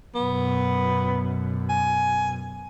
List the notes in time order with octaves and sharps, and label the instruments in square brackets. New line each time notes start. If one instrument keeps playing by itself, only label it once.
[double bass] F#2 B2 [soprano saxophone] B3
[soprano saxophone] G#5